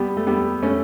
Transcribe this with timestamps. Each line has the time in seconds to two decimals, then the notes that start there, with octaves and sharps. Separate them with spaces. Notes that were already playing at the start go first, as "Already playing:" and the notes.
Already playing: G3 B3
0.17 A3
0.27 G3 B3
0.63 A3 C#4